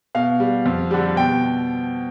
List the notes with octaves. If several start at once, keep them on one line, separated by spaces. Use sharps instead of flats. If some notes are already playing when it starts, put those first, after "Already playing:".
B2 F5
G3
F2
D3 G3
B2 G5